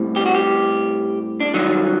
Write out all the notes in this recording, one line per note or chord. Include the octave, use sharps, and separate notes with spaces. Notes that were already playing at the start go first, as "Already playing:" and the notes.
Already playing: A2 G3 C4
G4
F#4
G4
D4
G2 D#3 F#3 D#4